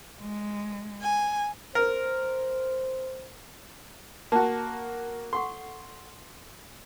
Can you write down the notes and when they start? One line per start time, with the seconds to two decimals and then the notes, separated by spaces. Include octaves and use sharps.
0.21 G#3
1.02 G#5
1.75 A#4 C5
4.32 A#3 F#4 A5
5.33 A4 F#5 C6 C#6